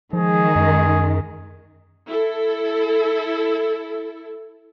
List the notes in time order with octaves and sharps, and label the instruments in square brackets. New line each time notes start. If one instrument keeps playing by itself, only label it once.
[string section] D#3 G#3 [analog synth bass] F3 [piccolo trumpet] G#4
[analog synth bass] F#2
[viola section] E4 A4